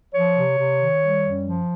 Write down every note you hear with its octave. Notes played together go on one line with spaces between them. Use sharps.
F3 C#5
C3
C3
D#3
G3
F#2
F3